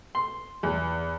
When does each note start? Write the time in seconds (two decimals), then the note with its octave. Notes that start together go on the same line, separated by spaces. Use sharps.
0.15 C6
0.63 E2